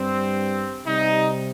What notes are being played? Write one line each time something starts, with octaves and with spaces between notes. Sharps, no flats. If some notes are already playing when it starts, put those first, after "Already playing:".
Already playing: G2 G3 C4
C3 G3 D#4